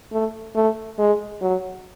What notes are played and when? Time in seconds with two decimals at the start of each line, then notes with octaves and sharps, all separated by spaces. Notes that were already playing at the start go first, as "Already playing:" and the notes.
0.12 A3
0.55 A3
0.98 G#3
1.41 F#3